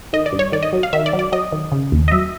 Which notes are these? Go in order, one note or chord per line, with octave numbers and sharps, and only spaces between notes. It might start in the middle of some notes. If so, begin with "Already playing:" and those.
D#3 D#5
D5
G2
C#5
D#3 D5
D#5
F#3
F5
D#3 E5
D5
F#3
D5
F#3 D#5
D#3
C#3
D#2
D#5
F#3 E5